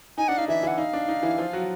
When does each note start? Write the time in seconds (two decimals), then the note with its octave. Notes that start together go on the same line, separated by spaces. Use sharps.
0.18 D#4 G#5
0.28 D4 F#5
0.38 D#4 F5
0.48 E3 E4 E5
0.63 E3 E4 F#5
0.78 D#4 F5
0.93 D4
1.08 D#4
1.23 E3 E4
1.38 F3 F4
1.53 F#3 F#4